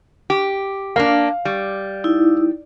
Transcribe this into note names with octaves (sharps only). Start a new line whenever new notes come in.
G4
A#3 D4 F5
G3
D#4 E4